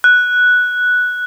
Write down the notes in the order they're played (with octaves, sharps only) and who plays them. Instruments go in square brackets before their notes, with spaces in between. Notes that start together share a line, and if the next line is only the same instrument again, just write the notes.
[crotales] F#6